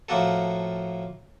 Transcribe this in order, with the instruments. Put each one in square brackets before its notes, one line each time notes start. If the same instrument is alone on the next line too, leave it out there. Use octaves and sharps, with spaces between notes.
[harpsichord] A2 F3 A#3 F#4 A4